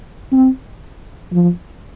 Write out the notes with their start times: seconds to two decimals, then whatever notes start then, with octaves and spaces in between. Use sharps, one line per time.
0.32 C4
1.33 F3